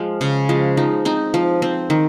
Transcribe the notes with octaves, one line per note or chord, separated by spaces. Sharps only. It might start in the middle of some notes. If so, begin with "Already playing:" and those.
Already playing: F3 G#3
C#3
F3 G#3
F3 D#4
C4 D#4
F3
C4
D#3